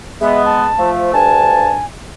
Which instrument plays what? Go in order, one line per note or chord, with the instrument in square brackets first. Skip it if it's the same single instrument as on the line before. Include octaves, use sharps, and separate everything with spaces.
[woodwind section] G#3 B3 [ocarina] E5
[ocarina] A5
[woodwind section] F3 A3
[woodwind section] D2 G2 A5 [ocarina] G#5